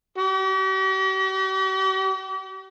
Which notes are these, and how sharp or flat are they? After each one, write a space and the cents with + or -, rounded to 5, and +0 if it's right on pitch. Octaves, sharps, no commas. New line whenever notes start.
G4 -45